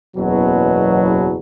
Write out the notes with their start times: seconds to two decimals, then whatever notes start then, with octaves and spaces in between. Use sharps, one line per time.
0.16 F#1 E2 B2 F#3